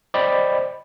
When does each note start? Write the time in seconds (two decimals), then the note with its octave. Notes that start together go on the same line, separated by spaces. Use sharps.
0.14 C5 D5 D#5 G5 B5